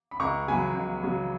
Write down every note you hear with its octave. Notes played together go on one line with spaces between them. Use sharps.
B5
C#2 A#5 C#6
C#3 F#3 G#5 B5
C#2
C#3 F#3